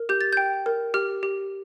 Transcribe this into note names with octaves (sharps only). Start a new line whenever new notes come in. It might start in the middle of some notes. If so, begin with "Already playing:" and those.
Already playing: A#4
G4 G6
A6
G5 G6
A#4
G4 F6
G4